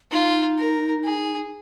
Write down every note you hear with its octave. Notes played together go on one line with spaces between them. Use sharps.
D#4 F4
A#4
G#4